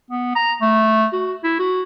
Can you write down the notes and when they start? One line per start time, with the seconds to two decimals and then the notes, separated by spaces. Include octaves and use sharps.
0.10 B3
0.35 A#5
0.61 A3
1.12 F#4
1.44 E4
1.59 F#4